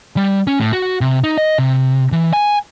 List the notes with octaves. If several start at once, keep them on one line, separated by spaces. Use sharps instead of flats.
G3
C#4
A2
F#4
C3
D#4
D#5
C3
E3
G#5